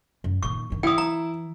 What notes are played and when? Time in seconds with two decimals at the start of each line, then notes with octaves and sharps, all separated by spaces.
0.24 F#2
0.43 A#2 D#3 C#6
0.70 G2 D#3
0.83 E3 E4 G5 D#6
0.98 A#5